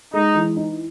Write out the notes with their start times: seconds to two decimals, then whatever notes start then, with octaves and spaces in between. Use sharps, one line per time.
0.13 G#3 D#4
0.35 E3
0.57 D#4